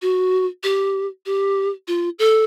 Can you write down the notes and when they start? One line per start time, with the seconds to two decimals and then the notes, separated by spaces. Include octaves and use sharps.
0.02 F#4
0.64 G4
1.26 G4
1.88 F4
2.19 A4